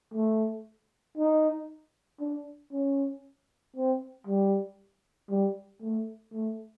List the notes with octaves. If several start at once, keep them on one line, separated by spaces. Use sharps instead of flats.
A3
D#4
D4
C#4
C4
G3
G3
A3
A3